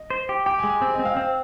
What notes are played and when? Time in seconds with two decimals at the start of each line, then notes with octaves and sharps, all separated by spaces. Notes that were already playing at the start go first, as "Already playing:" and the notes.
Already playing: D#5
0.10 C5
0.29 G4
0.46 G4 G5
0.58 G#5
0.64 G#3
0.69 G#5
0.82 C4 G5
0.94 D#5
0.99 C4
1.05 F5
1.17 C4